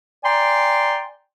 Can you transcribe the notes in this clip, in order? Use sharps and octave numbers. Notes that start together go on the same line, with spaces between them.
D5 G5 G#5 A#5 C6